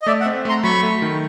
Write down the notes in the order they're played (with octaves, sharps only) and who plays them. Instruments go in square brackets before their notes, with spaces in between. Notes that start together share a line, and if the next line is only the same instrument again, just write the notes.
[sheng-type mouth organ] D#5
[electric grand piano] A3 [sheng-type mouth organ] D5 E5
[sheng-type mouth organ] E5 F#5
[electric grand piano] C4
[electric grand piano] A3 [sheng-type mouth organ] A#5 C6
[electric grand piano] F#3 [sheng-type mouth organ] B5 C#6
[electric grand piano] A3
D#3